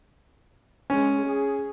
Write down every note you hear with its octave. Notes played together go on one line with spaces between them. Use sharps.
G#3 C#4
G#4